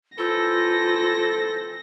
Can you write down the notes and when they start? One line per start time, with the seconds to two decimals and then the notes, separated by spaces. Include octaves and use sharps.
0.18 E3 C4 F4 A4 A#6